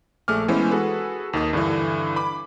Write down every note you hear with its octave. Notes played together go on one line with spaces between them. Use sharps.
A#1 A3 G#4 D6 F6
E3 G#3 B3 C#4 C5
F#4 G#4 A4 B4
D#2 D#3 D#6
G2 D3 E3
B5 D6